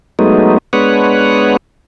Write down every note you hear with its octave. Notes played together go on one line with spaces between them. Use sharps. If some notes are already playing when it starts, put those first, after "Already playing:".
F#3 G#3 A3 B3 D#4
G#3 B3 D4 B4 C#5 F#5